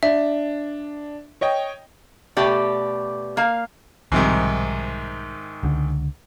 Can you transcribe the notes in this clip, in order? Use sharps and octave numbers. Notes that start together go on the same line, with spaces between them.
D4 E5
C#5 D#5 G5
B2 A3 G4 D5
A#3 F5
B1 G#2 C3 D#3 F3 G3
C#2 D3